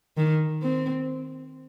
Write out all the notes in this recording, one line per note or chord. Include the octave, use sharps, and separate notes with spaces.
D#3
C4